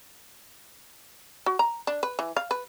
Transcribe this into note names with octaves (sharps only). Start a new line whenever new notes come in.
F#4
A#5
D4
B4
E3
F5
B4